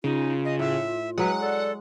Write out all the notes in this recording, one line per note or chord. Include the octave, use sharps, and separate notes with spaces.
C#3 D#4 F4
D#5
A2 E5
F#3 G#3 B4 F#5
A4 D5